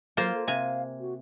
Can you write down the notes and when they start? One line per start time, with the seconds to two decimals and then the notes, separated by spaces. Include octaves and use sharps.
0.17 F#3 A#3 F4 C5
0.35 A4
0.48 C3 F5 G#5
1.00 F#4